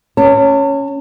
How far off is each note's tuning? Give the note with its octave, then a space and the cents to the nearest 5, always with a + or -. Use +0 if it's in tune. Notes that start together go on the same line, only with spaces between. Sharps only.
C#4 +0 A5 +45